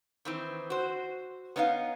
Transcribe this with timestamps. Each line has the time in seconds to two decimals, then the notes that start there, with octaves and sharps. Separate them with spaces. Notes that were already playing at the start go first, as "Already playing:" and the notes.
0.25 D#3 E3 C4
0.70 F#4 C5
1.56 B3 C#4 D#4 G4 F5